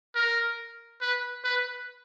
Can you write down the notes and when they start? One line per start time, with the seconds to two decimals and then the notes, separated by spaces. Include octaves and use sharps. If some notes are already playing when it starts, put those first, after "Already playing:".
0.15 A#4
1.01 B4
1.44 B4